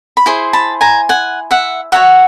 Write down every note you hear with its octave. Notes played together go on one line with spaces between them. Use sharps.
B5
E4 G#4 C5 C6
A5 B5
G#5 A#5
F#5 G#5
E5 F#5
F#4 A#4 C#5 E5 F#5